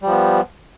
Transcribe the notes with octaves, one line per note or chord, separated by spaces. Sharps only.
F3 G3 B3